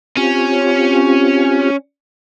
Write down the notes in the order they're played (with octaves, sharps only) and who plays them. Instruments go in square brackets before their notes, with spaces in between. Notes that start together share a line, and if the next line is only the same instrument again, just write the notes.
[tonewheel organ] C4 F4 G4 [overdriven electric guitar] C#4